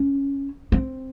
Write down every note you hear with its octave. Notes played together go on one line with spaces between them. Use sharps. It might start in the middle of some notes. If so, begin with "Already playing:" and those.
Already playing: C#4
C4